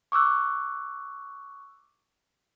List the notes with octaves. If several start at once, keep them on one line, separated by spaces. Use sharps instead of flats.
C#6 D6 E6 F#6